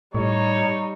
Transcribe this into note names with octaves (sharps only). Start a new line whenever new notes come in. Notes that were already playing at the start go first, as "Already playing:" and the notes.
A2 G3 D#4 C#5